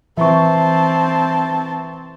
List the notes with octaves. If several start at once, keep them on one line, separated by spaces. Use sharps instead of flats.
E3 C4 E5 A5 A#5 C#6